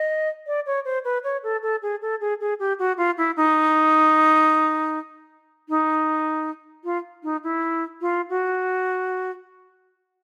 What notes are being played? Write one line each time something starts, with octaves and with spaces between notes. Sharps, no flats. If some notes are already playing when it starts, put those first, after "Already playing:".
Already playing: D#5
D5
C#5
C5
B4
C#5
A4
A4
G#4
A4
G#4
G#4
G4
F#4
F4
E4
D#4
D#4
F4
D#4
E4
F4
F#4